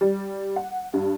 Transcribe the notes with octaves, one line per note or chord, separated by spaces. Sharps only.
G3
F#5
G2